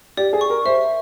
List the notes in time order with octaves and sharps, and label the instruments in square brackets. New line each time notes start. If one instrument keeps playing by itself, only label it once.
[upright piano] G4 [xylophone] D5
[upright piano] G#4
[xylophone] C#6
[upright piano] A#4
[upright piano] C5 [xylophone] E5